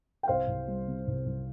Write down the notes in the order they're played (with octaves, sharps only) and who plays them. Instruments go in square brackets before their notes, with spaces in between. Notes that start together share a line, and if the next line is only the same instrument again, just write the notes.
[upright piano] G5
C2 C5 F5
C2
G3
C3
C2
C2